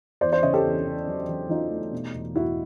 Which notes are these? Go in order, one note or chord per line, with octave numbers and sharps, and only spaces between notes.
E2 C5 D5
C5 D5
C#3 C#5 D#5
G4 A4
E2
C#3
F#3
F#3
F#3 D#4 F4
A3
B2
E1
E2 E4 F#4